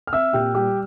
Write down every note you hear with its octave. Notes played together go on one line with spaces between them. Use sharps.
F6
C4 E5 E6
A#2 G4 G5
G3 G4 G5